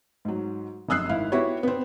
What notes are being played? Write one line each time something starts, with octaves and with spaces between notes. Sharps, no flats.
G#2 F#3
F1 F#2 D#6 E6 F#6 C7
G#1 E4 F5
B3 E4 F#4 G4 B4 C#5
B3 C4